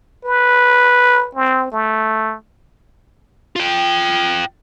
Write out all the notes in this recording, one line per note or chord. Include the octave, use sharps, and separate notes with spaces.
B4
C4
A3
F4 G5